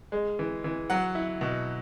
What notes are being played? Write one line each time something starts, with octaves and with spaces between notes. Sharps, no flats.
G#3
E3
E3
F#3 F#5
E4
B2